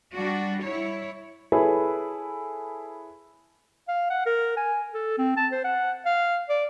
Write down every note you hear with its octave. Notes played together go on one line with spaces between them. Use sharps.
G3 D4 F#4
E4 C#5
E4 G#4 A4 B4 C#5
F5
F#5
A#4
G#5
A4
C4
A5
C5
F#5
F5
D5